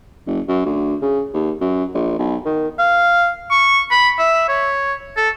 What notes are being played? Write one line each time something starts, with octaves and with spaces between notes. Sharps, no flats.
F#1
F#2
D2
C#3
D#2
F#2
A#1
B1
D#3
F5
C#6
B5
E5
C#5
A4